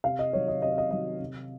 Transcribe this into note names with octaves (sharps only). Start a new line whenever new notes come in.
C3 F5
D#5
D#3 F#3 C#5
D#5
C3 D#5
C#5
D#5
D#3 F#3 D#5
C3